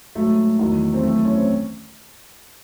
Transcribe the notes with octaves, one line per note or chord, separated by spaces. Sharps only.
G#2 F#3 A3
E2 D#3 F#3
C4
F#2 E3 A3
C#4
C4